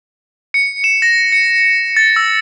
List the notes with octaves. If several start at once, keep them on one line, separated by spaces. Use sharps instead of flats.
C#7
E7
A#6
C#7
A6
E6